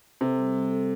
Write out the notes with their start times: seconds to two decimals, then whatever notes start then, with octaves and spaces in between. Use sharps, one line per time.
0.21 C3 A4
0.37 G3
0.54 G3
0.71 A4